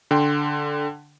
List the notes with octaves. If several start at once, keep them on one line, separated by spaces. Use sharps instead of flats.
D3 G5 C6